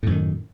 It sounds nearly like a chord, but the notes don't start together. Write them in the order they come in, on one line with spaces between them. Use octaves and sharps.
A2 F#2 D#3